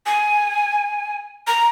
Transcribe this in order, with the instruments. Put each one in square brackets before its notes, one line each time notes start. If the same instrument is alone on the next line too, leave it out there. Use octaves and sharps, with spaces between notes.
[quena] G#5
A#5